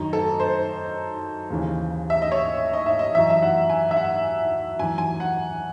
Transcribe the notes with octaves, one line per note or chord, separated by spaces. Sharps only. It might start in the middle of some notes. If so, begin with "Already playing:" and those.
Already playing: F#2 D#3 D#4
A4
C5
D#2 C#3 E3
E5
D#5
C#5
D#5
E5
D#5
F#2 E3 E5
E5
F#5
G#5
E5
F#5
F#2 E3 G#5
G#5
F#5